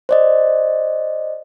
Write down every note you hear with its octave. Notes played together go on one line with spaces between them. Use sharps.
C5 D5 D#5